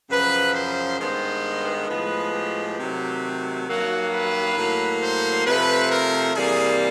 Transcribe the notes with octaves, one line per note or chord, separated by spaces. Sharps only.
F#2 C#3 F3 B4
C5
G2 D#3 G#3 B3 C5
A2 F3 G#3 B3 B4
G4
C3 D#3 F#3 A3
G2 D#3 F#3 A#3 F#4
B4
A2 F#3 A#3
C5
C3 F3 A3 B4
A#4
C3 E3 G3 A#3 G#4